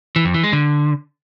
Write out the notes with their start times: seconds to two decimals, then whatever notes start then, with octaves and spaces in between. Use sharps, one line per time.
0.16 E3
0.25 F2
0.34 E3
0.43 G#3
0.53 D3